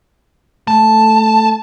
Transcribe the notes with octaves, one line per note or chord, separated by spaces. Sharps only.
A3 A5